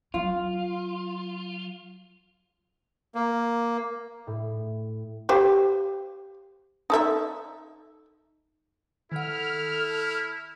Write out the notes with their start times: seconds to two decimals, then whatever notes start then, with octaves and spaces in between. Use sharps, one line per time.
0.14 F#3 F4
3.15 A#3
4.27 A2
5.29 G4 C5 F5
6.90 D#4 A4 E5
9.12 D#3 E4 A4 F#5 F6